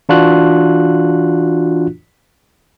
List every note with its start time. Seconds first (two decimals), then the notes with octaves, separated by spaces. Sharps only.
0.09 E3 D4 F4 F#4 F#6